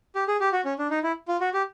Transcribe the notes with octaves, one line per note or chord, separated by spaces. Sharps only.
G4
G#4
G4
F#4
C#4
D4
D#4
E4
F4
F#4
G4